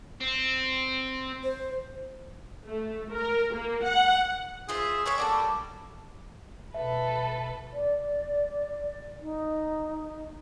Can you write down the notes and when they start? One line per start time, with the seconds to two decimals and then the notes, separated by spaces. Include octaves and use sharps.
0.20 C4
1.44 C5
2.66 A3
3.11 A#4
3.53 A#3
3.83 F#5
4.69 F4 G#4 C5 E5
5.06 C#5 E5 F5 G#5
5.18 A#3 F#4 A4 D5
5.31 G3
6.74 B2 A4 B4 E5
7.73 D5
9.21 D#4